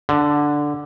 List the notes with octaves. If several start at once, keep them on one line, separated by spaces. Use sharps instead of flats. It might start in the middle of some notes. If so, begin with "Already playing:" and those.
D3